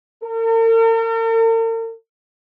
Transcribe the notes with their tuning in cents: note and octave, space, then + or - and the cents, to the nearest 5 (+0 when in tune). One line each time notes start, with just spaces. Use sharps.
A#4 -45